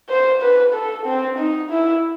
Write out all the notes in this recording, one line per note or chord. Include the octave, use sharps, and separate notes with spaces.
C5
B4
A4
C4
D#4
E4